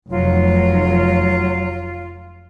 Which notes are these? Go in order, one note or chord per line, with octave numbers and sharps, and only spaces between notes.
F1 F#3 F4